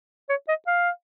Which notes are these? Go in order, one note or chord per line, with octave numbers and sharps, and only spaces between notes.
C#5
D#5
F5